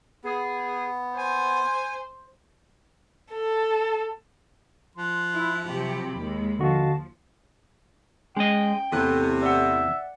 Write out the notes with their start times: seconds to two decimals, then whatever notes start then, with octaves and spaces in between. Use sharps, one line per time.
0.24 B3 G#4
1.17 C5 G#5
3.32 A4
4.96 F3 C6 F#6
5.34 E4
5.66 C3 F#3 G4 B5
6.19 D#2 G#3
6.59 D3 F3 F#4 D#5 F5 A5
8.37 G#3 C#4 D#5 G5
8.92 E2 A2 C3 A4 F#6
9.43 D5 E5 F#5